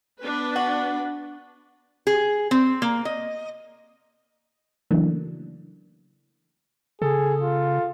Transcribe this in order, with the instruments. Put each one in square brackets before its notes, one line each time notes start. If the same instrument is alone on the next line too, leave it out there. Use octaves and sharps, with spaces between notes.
[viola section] B3 D4 B4
[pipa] F#4
[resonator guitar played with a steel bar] G#4
C4
A#3
D#5
[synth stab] C#3 E3 F#3 A3 A#3 D4
[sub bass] C#3 [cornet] G#4 [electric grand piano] A4
[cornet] F4